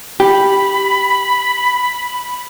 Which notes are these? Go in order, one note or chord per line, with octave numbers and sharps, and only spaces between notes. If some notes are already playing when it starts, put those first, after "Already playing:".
G4 B5